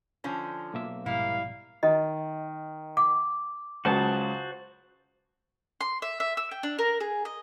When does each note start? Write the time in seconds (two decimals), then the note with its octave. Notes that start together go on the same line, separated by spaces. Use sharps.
0.24 D3 F3 C#4
0.74 B1 A#3 E5
1.06 A#1 G#2 B2 G3 A#3 E4 F5
1.83 D#3 D#5
2.97 F#5 D6
3.85 C#2 C#3 F#3 F#4 B4 C5 G5 A5
5.81 C6
6.02 E5
6.20 E5
6.37 E6
6.51 G5
6.63 D4
6.79 A#4
7.00 G#4
7.25 D#5